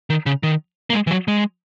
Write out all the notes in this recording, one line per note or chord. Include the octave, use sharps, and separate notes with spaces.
D#3
C#3
D#3
A#3
G#3
E3
F#3
G#3